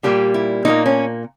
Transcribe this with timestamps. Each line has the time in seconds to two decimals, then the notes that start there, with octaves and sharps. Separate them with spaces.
0.03 A#2 G3 A#3 G4
0.34 E4
0.65 A#2 G3 A#3 D#4
0.86 C#4